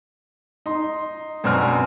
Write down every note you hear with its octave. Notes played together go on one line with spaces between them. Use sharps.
D#4 C6
F#2 B2 C4 D4 F6